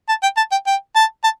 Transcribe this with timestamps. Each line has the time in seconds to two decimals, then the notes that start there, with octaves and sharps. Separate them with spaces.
0.09 A5
0.23 G5
0.37 A5
0.51 G5
0.67 G5
0.96 A5
1.24 A5